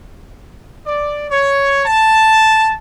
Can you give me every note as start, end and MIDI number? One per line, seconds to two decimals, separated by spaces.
0.86 1.27 74
1.31 1.85 73
1.86 2.74 81